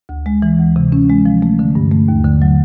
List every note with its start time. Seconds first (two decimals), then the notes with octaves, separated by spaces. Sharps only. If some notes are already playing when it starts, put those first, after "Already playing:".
0.09 D2
0.26 G#3
0.42 E3
0.59 D2
0.76 C3
0.92 C#4
1.09 G#3
1.26 F3
1.42 A3
1.59 D3
1.75 G2
1.91 A3
2.08 D#2
2.25 D3
2.42 F#3